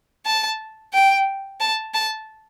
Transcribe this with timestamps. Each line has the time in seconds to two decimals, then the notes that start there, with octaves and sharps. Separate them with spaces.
0.26 A5
0.93 G5
1.60 A5
1.94 A5